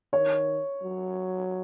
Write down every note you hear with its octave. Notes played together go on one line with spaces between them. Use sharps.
D#3 C#5
F#3